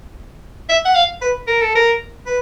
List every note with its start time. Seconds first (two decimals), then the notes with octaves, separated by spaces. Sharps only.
0.69 E5
0.85 F#5
0.95 F5
1.21 B4
1.47 A#4
1.61 A4
1.75 A#4
2.26 B4